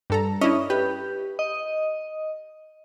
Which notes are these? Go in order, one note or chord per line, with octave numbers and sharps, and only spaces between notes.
G2 A4 A#5
C#4 D4 E4 D#5
G4 B4
D#5